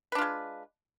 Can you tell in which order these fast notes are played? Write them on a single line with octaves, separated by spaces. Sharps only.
B4 D4 F4 G#3